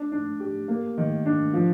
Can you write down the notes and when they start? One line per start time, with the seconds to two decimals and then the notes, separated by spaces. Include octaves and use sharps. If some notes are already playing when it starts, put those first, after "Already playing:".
Already playing: D4
0.12 D4
0.40 G4
0.68 A#3
0.98 D#3
1.26 D4
1.54 F3